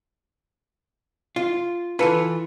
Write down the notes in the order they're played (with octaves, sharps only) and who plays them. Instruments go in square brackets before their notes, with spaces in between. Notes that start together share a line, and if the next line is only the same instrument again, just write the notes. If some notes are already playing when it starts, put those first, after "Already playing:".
[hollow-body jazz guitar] F4
[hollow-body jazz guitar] E3 F4 [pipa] A4 B4